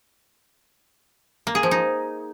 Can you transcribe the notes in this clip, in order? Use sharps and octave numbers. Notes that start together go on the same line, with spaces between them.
A#3
G#4
F3
D#4